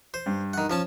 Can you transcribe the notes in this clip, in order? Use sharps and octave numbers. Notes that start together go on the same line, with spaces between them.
C5
G2
D#3 F#5
F3 C#4 A5